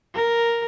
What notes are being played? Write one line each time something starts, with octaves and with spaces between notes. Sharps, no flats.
A#4